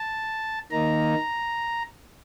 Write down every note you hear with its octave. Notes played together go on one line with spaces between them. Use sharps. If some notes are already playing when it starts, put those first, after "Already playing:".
Already playing: A5
D#3 A#3 D#4 A#5